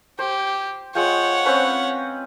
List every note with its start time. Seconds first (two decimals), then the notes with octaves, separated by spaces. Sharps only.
0.19 G4 C5
0.95 G#3 F4 C#5 F#5 G5
1.45 C4 C#4 B4